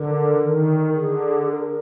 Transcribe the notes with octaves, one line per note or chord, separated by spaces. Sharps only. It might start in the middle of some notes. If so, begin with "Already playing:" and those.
Already playing: D3 A#4
D#3
D3 G#4
A#4